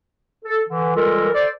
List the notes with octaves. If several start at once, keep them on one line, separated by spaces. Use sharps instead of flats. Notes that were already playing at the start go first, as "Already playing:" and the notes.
A4
D3 E3
E3 G3 G#3 F4 A4 A#4
A4 C5 D5